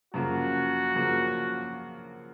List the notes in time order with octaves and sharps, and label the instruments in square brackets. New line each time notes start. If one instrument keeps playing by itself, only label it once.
[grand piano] F#2 C#3 F3 A#3 [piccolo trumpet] F#4
[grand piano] F#2 C#3 F3 A#3